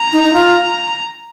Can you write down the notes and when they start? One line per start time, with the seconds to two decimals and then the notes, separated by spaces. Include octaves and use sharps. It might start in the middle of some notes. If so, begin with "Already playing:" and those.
Already playing: A#5
0.12 D#4
0.23 D#4
0.33 F4